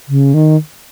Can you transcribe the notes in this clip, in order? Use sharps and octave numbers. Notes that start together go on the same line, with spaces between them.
C#3
D#3